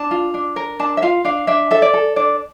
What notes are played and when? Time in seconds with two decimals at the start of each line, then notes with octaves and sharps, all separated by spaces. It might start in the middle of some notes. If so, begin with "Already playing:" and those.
Already playing: D4 A5
0.11 F4
0.34 D4
0.56 A#4
0.79 D4 A5
0.97 E5
1.02 F4 F5
1.25 D4 F5
1.47 D4 E5
1.71 A4 E5
1.82 D5
1.94 A4
2.16 D4 D5